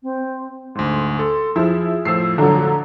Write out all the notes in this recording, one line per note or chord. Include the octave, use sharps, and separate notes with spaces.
C4
D2 G#2 C6
A4 C6
F3 E4 G#4 E6 F6
A2 F3 E6 C7
D3 F#3 A#5